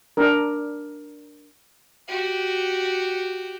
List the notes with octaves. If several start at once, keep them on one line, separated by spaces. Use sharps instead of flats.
D4 A#4
F#4 G4